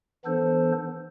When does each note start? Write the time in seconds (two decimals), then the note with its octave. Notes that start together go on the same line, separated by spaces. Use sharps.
0.25 E3 B3 D4 A4 C5